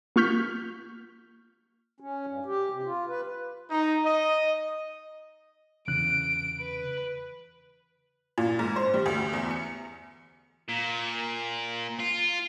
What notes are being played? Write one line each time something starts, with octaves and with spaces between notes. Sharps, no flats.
A#3 F4 C#6 F6 G6 B6
C#4
G2
G4
C3
F4
B4
D#4
D#5
E2 C#3 F#6 D7
B4
A#2
G#2
C5
G3
D2
E2
C#7
A#2
F4